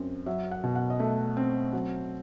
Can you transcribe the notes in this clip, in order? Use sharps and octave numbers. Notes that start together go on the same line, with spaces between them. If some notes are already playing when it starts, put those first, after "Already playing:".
Already playing: F#2 C4
F#3 E5
F#5
B2
F#5
D#5
A3 E5
C4
F#3